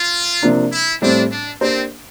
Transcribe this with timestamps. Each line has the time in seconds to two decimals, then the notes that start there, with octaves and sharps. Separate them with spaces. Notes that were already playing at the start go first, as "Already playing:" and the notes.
Already playing: F4
0.42 C3 F3 A#3 D4
0.72 E4
1.01 A2 G3 C4 D4
1.30 D4
1.61 A#3 C4 D4 G4 C5